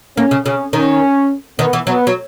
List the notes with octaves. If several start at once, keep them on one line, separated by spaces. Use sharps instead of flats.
A#3 C#4
C#3
C#3 C#4
D#3 C#4
D#3 B3
E3
F#3 B3
F#3